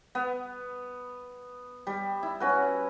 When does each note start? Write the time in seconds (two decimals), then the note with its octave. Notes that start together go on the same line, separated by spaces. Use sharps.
0.15 B3
1.87 G3
2.23 E4
2.40 C#4 F#4 B4